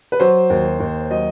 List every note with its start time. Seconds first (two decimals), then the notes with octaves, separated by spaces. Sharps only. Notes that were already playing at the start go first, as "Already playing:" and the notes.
0.12 B4
0.20 F#3 C5
0.50 D#2
0.80 D#2
1.10 F#3 D#5